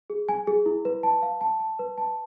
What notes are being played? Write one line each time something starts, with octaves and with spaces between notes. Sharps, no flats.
G#4
G#5
G#4
E4
B4
A5
F5
A5
A5
B4
A5